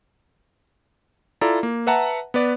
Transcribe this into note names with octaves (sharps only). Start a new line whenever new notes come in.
E4 F4 A4 D5 A#5
A#3
B4 E5 F#5 A5 A#5
B3 B4 D5